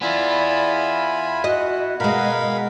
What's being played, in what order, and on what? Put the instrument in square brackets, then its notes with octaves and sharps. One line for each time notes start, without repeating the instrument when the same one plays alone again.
[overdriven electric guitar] B3 E4 [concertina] F4 G#5 B5 [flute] D5
[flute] F#4 [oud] D#5
[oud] B2 G#3 [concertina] A#4 F5 B5 [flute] F#5